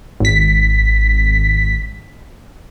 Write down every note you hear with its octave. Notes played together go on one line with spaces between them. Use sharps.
G#1 B6